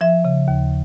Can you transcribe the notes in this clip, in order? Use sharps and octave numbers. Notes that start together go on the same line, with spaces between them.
F3 E5
C#3
D#2